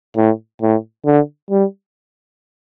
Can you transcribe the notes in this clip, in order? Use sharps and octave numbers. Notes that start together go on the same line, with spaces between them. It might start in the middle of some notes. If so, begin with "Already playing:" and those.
A2
A2
D3
G3